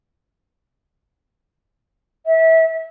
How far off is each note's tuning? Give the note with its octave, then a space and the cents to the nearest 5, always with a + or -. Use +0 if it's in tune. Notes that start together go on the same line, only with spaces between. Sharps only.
E5 -25